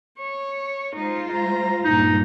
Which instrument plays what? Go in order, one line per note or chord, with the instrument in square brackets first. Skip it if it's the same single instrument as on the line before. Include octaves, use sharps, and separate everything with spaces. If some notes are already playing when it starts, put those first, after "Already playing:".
[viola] C#5
[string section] G#3 F4 C5 [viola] D#4
[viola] A#5
[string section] C#2 G2 A#2 [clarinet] D#4